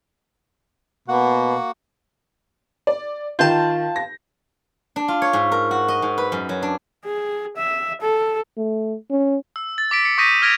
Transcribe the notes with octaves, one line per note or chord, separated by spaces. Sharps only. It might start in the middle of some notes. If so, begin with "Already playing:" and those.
B2 A#3 F#4 F#5
D5
D#3 F4 A5 G6
A#6
D4
F4
C#5
G#2
A#4
F#4
D#5
G#2
B4
F#2
F#3
D4
G#4
E5
A4
A3
C#4
E6
A6
D6 B6 D7
C#7
C#6 D#6 G6 A#6 B6 D#7
F6 G#6 A#6 D7 F7